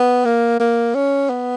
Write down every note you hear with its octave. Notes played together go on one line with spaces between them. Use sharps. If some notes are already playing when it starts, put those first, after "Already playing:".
Already playing: B3
A#3
A#3
C#4
B3